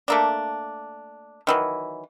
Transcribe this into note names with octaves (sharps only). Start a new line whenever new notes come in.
A3 A#3 D4
D#3 E3 F#3